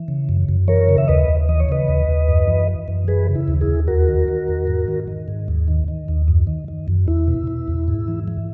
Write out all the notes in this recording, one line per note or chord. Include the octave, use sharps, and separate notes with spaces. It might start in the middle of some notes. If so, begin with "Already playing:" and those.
Already playing: E3
C#3
F#2
F#2
E3 A#4 C#5
C#3
E5
D#2 B4 D#5
D#2
E3 D#5
C#5
C#3 B4 D#5
D#2
D#2
F#2
E3
E3
F#2
E3 G#4 B4
C#3
E4
D#2
E4 G#4
D#2
E2 F#4 A#4
D#3
D#3
E2
G#2
D#3
D#3
G#2
D#2
D#3
D#3
D#2
F#2
D#3
D#3
F#2
E2 E4
B2
B2
E2
G#2
E3
E3